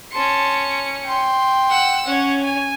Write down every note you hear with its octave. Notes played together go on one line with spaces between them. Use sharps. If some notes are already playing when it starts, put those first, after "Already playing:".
C#4 A5 C6 C#7
G5 C6
F#5 E6
C#4 C#5 F#5
G#5